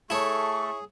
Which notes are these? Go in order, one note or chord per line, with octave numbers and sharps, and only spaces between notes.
A3 E4 G#4 A4 C#5 C#6